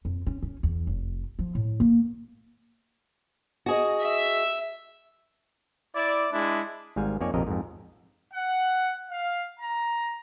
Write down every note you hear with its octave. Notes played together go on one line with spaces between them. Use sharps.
F2
C#4
C#4
E2
F1
F3
A2
A#3
F#4 G#4 D#5
E5
E4 D5
G#3 D4 E4
G#1 G#2 G3 F5 G#5
F2 A#3 D#4 C#5 D5 G#5
A#1 F2 C3 A#4 D#5
F2 G#2
F#5
F5
A#5